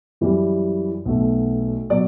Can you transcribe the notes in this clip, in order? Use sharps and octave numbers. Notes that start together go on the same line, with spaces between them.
F#2 E3 G3
B1 B2 A3
B2 F#3 D5